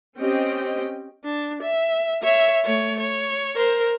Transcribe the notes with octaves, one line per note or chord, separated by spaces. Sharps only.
C4 C#4 G4 D#5 G5
D4
E5
C#5 E5
A3 C#5
C#5
A#4 C5